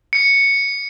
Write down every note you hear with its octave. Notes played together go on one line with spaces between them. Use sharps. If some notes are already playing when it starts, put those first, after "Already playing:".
C#7